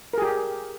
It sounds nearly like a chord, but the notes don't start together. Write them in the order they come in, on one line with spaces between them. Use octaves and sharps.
A#4 G#4 G4